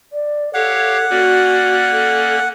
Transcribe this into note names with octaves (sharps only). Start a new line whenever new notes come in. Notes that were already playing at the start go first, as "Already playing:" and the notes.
D5
G4 A4 C#5 F5 F#5
A#3 C#4 F#4 D5
A4